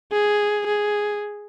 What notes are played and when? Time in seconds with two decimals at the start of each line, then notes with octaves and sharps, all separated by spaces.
0.12 G#4
0.66 G#4